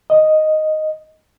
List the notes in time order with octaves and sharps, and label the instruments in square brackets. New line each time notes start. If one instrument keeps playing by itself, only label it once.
[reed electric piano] D#5